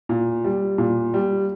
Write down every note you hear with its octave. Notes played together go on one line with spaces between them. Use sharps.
A#2
G3
A#2
G3